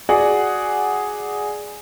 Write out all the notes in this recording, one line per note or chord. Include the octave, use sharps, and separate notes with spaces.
F#4 G#4 D5 F#5